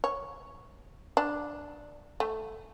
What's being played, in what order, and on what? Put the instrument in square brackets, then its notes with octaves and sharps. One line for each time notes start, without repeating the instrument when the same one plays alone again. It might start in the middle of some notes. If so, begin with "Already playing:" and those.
[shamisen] C#5
D4
A3